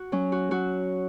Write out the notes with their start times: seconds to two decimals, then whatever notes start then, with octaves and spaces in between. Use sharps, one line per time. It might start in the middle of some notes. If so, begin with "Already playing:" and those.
Already playing: F#4
0.12 F#3 C#4
0.32 F#4
0.51 F#3 F#4